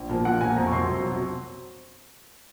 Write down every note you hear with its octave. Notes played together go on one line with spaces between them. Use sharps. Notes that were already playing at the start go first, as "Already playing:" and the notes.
Already playing: A#1
A#2 F3 A#3
A#1 F#5
A#2 F3 A#3 G#5
F2 A#5
C#6
C3 F#3 C6
F2
C3 F#3